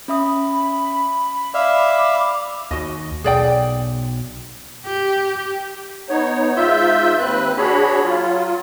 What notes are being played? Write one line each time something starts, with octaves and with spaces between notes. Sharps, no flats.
C#4 E5 B5 D#6
D5 E5 F5 D6
D#2 F#4 D#5
B1 G#4 D5 G5
G4
B3 D#4 C#5
G#2 F4 E5 E6 G6
D#2 C4 B4 F#6
D4 F#4 G#4 C#5 B5
F#3 F4